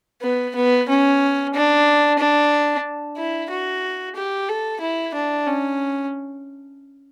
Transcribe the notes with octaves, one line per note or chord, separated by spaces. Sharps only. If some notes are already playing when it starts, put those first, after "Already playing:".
B3
B3
C#4
D4
D4
E4
F#4
G4
A4
E4
D4
C#4